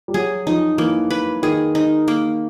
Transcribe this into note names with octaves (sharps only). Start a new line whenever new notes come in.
G3
F#3 G#4
F3 D#4
E3 A#3
B4
D#3 G#4
D#4
A#3